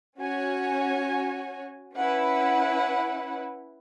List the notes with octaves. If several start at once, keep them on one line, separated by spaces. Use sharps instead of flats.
C#4 F#4 C#5 G#5
C#4 E4 B4 F#5